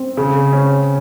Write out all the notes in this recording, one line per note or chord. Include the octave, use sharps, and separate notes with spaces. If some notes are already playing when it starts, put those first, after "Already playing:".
Already playing: C4
C#3
C#4